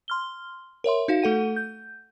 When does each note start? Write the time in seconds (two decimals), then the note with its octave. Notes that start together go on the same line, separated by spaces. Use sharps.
0.08 C6 F6 G7
0.84 A#4 C#5 E5 C6
1.08 D#4 F#4 F5
1.22 A3 A4 F#5 D#7
1.56 G6